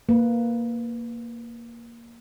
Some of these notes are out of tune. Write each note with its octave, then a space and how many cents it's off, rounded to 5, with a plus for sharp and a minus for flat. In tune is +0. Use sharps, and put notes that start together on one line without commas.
A#3 +0 B4 +0